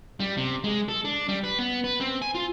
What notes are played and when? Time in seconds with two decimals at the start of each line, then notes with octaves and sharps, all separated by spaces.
0.20 G3
0.37 C3
0.64 G#3
0.89 A4
1.05 D4
1.29 G3
1.44 B4
1.59 B3
1.84 B4
2.00 C4
2.22 G#5
2.35 F4